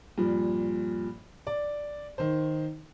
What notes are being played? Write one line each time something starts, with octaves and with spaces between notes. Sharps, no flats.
G2 A#2 F3
D5
D#3 C5